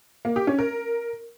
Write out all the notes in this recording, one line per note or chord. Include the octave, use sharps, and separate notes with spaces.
A#3
G4
C#4
A#4